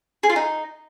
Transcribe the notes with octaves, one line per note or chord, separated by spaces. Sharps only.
G#4
F4
D#4